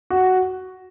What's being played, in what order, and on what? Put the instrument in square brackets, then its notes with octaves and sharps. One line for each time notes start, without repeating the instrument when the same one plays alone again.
[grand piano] F#4